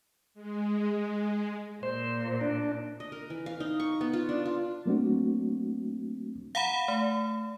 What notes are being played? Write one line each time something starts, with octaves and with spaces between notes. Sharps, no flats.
G#3
A#2 C5
D4
D#5
A#4
E3
F5
D#4
C#6
B3
F4
D4
F4
F#3 A3 A#3 C4 D4 F#4
F5 F#5 A#5 B5
A3